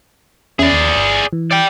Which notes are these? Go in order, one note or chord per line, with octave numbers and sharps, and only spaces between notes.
E2 C#4 G#4 D5 E5
D#2
G1
E3
D5 G5